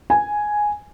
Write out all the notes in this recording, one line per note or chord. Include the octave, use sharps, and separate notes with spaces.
G#5